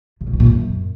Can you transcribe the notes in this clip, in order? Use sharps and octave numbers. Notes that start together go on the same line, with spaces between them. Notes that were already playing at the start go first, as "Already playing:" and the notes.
C#3
B2
B3
A#2
F#2